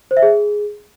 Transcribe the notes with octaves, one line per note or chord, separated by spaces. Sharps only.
C5
E5
G#4